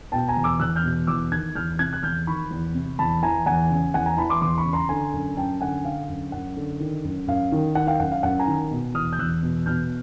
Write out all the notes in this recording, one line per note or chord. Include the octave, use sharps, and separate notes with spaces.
B2 G5 A5
G#5 A#5
E2
D6 E6
E2 E6 F#6
F6 G6
B2
E2 D6 E6
D#3 F#6 G#6
E2 F6 G6
C3 F#6 G#6
F#6
E2 F6 G6
D#3 B5 C#6
E2
C3
E2 A5 B5
E3 G#5 A#5
E2 F#5 G#5
C#3
E2 F#5 G#5
G#5 A#5
E3 A5 B5
C6 D6
E2 C6 D6
B5 C#6
C#3
A#5 C6
D3 G#5 A#5
F#2
F#2 G5 A5
D3 F#5 G#5
D3 F5 G5
F#2
F#2 F#5
D3
D#3
F#2
F#2 F5
D#3
D#3 F#5
F5 G5
F#2 F#5
F5
F#2 F#5
G#5 A#5
D#3
B2
E2 D#6 F6
G6
E2 E6 F#6
B2
B2 F6 G6